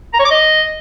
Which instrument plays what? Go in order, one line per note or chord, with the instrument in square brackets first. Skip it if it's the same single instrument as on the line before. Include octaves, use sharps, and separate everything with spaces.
[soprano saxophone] A#5
C#5
D6
D#5